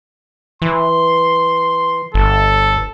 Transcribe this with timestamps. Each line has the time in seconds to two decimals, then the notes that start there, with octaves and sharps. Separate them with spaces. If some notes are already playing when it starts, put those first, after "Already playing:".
0.62 E3 C6
2.14 G1 A4